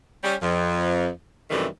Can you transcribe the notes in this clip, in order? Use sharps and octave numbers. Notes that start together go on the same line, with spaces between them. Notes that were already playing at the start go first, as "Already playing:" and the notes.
G3 C#4
F2
F#2 C3 D#3 E3 G3 A3